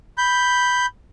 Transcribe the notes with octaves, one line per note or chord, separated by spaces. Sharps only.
B5 G6